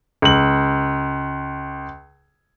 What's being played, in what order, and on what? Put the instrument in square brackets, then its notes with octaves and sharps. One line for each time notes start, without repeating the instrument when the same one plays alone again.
[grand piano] C#2 F#7